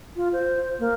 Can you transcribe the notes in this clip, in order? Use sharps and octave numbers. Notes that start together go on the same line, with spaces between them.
F4
C5
A#3